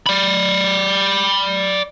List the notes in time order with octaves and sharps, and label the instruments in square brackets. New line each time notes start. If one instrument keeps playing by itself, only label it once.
[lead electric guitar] D5 B5